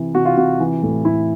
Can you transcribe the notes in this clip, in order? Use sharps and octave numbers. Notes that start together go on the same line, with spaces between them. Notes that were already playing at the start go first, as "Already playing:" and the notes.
Already playing: C3 E3
C3 F#4
F4
C3 F#4
E3
A2
A2 E4